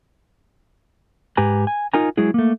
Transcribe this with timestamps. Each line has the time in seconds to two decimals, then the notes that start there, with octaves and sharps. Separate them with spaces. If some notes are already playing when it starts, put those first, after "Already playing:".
1.37 G#2 G4 B4 G#5 A#5
1.67 G#5
1.94 D#4 F4 A#4 G#5 A#5
2.17 F#3 G#3 E4 G#4
2.34 A3 A#3